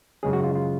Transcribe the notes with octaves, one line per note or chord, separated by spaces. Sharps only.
F#2 C#3 G#3 C#4 G#4
F#4
F4
F4